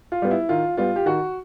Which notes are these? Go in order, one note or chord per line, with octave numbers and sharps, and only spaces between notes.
F4
G3 B3
E4
D#3 F4
G3 B3 F4
G4
D#3 F#4